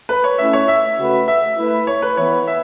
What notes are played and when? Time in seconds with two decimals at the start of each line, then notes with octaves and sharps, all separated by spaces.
0.09 B4
0.24 C#5
0.38 A3 C#4 E4 A4 E5
0.53 C#5
0.68 E5
0.98 C#3 A3 F#4 B4
1.28 E5
1.58 A3 E4 B4
1.87 C#5
2.02 B4
2.17 E3 B3 E4 B4 C#5
2.47 E5